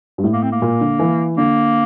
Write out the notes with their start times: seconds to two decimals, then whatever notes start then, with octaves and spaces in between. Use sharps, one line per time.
0.18 G2
0.24 A2
0.33 A#3
0.43 C4
0.52 A#3
0.62 A#2
0.81 D3
0.99 E3
1.37 D3 A#3